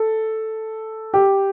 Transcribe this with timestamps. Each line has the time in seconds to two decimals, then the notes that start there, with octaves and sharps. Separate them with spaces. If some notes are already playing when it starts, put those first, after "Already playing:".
Already playing: A4
1.14 G4